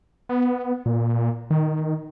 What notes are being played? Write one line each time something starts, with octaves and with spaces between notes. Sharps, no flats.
B3
A#2
D#3